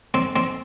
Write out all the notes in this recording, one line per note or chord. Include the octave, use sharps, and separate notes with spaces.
C4
C4